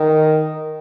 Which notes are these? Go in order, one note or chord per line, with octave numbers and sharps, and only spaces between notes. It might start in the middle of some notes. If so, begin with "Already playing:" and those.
Already playing: D#3